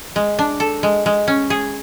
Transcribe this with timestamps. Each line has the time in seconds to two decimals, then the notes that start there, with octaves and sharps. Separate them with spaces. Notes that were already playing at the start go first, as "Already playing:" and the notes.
0.16 G#3
0.39 D4
0.60 A4
0.83 G#3
1.06 G#3
1.28 C#4
1.50 G#4